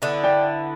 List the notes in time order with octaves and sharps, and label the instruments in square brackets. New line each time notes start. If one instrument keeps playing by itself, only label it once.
[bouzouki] D3 B3 E4
[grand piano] D5 G5